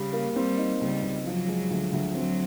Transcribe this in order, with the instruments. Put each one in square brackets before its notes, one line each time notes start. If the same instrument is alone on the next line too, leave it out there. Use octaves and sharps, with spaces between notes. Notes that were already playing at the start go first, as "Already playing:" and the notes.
Already playing: [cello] C#3 [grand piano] G3
[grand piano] A#3
[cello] G3 [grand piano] C4
[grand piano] D#4
[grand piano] C#2 [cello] G3
[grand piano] C#2
[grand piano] F3 [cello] F#3
[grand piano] G#3
D2
D2
[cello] F#3 [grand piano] C4